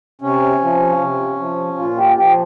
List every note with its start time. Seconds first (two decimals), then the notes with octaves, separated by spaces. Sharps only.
0.22 C3 C#4
0.61 F3
1.00 C3
1.38 F3
1.78 A#2 F4
1.97 G4
2.16 F3 G4